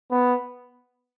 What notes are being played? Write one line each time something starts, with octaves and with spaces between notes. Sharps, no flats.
B3